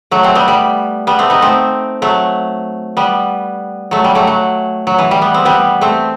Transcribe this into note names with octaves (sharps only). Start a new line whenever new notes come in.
F#3 A3
A3 C4
G3 B3
G3
G3 B3
A3 C4
B3 D#4
A3 C4
F#3 A3
G3 B3
F#3 A3
G3
F#3 A3
F#3
F#3
E3
G3
B3
C4
G3 B3
A3 C4